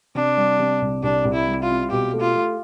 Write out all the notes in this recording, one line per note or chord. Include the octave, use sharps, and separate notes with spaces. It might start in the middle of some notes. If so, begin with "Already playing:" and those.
C3 D4
G3
C3
C2
C2 D4
C2
E4
G3
F4
C4
B2 G4
A3
F4
A3